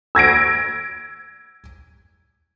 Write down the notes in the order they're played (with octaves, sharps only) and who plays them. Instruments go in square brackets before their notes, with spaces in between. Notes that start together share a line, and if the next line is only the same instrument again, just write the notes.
[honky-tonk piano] E6 G#6 A#6 D7